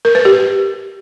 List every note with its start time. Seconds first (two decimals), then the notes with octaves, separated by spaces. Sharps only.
0.05 A#4
0.15 B4
0.25 G4